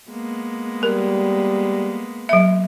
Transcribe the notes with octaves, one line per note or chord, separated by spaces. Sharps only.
G#3 A#3 B3
G3 A#4
F#3 E5